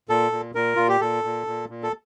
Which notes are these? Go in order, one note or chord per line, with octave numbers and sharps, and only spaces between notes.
A#2 A4
A#2
A#2 A#4
A#2 F4
G4
A#2 A4
A#2
A#2
A#2
A4